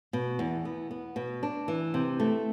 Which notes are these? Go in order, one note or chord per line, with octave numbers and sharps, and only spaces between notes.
B2
E2
B3
B3
B2
D4
E3
C3
A3